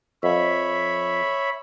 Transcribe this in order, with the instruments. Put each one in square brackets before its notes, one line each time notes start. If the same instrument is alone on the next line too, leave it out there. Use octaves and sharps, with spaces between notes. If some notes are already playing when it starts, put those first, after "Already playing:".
[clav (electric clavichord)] F2 [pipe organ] C#5 E5 B5